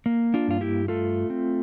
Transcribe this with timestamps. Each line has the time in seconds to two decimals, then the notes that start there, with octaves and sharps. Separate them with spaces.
0.06 A#3
0.34 D4 F4
0.48 G2 F4
0.61 E4 G4
0.88 A3 F4 A4
1.30 C4